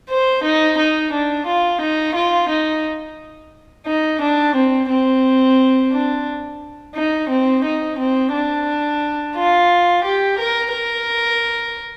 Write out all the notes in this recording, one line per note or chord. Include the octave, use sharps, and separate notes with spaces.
C5
D#4
D#4
D4
F4
D#4
F4
D#4
D#4
D4
C4
C4
D4
D#4
C4
D#4
C4
D4
F4
G4
A#4
A#4